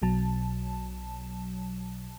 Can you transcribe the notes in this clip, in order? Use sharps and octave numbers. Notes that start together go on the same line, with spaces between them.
B1 B2 F#3 A5